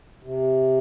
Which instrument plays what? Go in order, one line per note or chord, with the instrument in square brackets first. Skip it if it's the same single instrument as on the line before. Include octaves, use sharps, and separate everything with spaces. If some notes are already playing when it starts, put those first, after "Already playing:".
[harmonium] C3